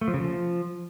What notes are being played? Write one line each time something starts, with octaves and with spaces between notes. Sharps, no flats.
A3
F3
C#3
F3